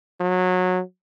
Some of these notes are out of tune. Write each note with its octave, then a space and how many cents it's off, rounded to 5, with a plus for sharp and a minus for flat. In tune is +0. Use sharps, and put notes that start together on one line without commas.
F#3 -20